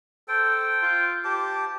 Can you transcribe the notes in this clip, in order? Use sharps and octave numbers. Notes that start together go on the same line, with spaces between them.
A4 C5 G5
F4
G4 C5 A5 D6